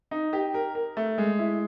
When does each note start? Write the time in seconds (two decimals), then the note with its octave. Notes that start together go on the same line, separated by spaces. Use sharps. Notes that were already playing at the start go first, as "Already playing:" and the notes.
0.11 D#4
0.33 G4
0.54 A#4
0.75 A#4
0.97 A3
1.18 G#3
1.39 E4